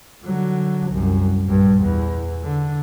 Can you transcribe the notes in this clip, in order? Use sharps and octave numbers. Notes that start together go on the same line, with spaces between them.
D3 F#3
C2 F#2
A#1 G2
E2
D3